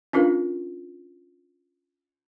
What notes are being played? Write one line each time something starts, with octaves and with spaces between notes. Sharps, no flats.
C#4 D4 F4 A#4 B4 F5